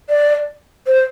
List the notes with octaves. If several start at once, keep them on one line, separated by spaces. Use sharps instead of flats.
D5
C5